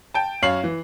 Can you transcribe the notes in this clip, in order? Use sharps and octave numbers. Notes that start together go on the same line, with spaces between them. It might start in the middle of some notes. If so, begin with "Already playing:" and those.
G5 A5
F#2 C#5 F5 C7 F#7
E3